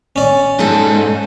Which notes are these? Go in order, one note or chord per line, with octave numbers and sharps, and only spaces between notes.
C#4 D5
G#2 D#4 A4